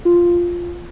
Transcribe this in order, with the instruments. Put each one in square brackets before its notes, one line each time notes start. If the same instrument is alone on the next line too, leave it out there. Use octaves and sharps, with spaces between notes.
[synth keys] F4